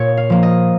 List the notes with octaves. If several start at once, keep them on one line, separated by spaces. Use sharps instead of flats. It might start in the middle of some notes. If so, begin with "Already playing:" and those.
Already playing: A#2 C#5
F5
F3 A#3
D#5